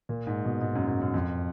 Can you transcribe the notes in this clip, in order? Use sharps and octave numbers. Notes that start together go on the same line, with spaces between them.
A#2
G#2
B2
G#2
F#2
F#2
F#2
F2